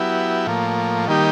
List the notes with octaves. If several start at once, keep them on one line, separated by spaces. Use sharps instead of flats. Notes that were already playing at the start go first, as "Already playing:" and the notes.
Already playing: F#3 B3 E4 G4
A2 F3 A#3
D#3 G3 A#3 D#4 G4